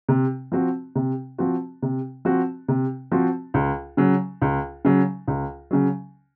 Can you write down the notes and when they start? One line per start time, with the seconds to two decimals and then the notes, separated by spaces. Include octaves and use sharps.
0.08 C3
0.52 F3 C4 F#4
0.95 C3
1.38 F3 C4 F#4
1.82 C3
2.25 F3 C4 F#4
2.68 C3
3.12 F3 C4 F#4
3.54 C#2
3.97 C#3 F#3
4.42 C#2
4.85 C#3 F#3
5.28 C#2
5.71 C#3 F#3